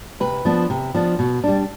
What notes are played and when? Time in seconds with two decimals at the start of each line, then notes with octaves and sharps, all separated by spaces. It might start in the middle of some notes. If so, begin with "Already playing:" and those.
0.20 C3 B4
0.45 F3 B3 D4
0.70 C3
0.95 F3 B3 D4
1.19 B2
1.44 G3 D4